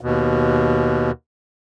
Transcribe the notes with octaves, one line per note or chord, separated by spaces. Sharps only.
D#2 B2